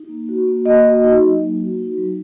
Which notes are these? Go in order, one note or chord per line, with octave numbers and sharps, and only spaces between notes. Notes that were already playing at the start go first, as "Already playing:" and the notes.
Already playing: D#4
A#3
F#4
A#3
A#3 D#5
F#4
D#4
F#3
A#3
F#4
D#4
F#3